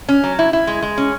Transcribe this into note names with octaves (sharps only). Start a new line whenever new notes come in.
C#4
F#3
E4
E4
G#3
G#3
C#4